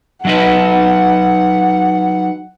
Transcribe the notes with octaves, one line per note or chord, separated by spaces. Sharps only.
F#3 D#4 B4 F#5